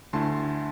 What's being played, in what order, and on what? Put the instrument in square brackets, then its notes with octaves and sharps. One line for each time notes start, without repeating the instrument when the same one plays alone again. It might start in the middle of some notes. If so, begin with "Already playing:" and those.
[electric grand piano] D2 D3 A3 E4 A5 C6